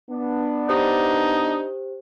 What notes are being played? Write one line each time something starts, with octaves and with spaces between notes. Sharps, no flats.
B3 D4
D#4 G4 C5